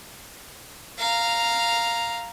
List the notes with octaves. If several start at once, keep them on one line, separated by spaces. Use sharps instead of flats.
F5 A#5